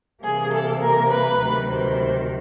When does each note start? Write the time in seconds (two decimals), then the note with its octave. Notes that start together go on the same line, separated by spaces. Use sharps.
0.24 C3 E3 G3 A#3 G#4
0.53 A4
0.82 A#4
1.10 B4
1.40 D2 C3 D#3 F#3
1.69 C5